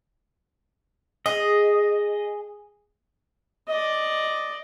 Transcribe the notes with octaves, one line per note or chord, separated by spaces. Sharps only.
G#4 D#5
D5 D#5